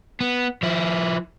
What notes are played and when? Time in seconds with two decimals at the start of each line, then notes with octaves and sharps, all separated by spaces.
0.21 B3
0.63 F3 E4